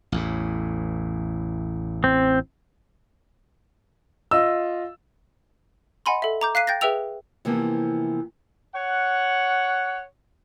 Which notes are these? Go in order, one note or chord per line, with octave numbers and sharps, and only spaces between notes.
A1 E2 A2
C4
F4 D#5 E6
D#5 F#5 G#5 B5 C6
A4 E5
A#5 D6 G6
F5 F#6 B6 C7 D#7
G5 G6 A6 A#6
G#4 B4 E5 G5 E6 F7
C3 E3 F3 A#3 B3
C#5 F#5